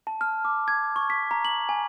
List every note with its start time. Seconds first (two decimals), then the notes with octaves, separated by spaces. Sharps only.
0.07 A5
0.21 F6
0.45 D6
0.68 G#6
0.96 C#6
1.10 B6
1.31 A#5
1.45 F#7
1.69 G#5